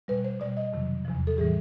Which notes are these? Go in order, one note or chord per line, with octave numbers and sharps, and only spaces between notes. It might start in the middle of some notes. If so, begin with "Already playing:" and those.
B2 G3 B4
C5
B2 G3 D5
D#5
F2 C3 D#3 F#3
E2 C3 F3
A4
A2 E3 G3 G#4